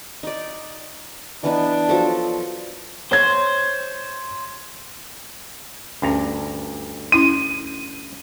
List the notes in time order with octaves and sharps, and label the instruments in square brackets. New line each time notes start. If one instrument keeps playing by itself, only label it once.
[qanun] D#4 D5
[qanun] E3 B3 D#4 [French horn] D4
[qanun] F3 F#3 A4
[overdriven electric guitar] C5 [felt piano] C#5 G#6
[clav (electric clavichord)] D2 G2 A#5 [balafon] C#4
[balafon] C#4 E4 C6 [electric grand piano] D#7